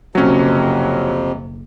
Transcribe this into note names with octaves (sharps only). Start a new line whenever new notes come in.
F#1 B1 F2 C3 F#3 C#4